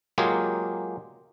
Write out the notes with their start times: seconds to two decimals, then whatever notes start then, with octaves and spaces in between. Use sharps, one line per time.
0.18 F#3 G#3 A#3 F4 G4 G#4